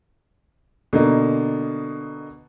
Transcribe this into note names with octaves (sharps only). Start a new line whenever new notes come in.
B2 D3 A#3 D#4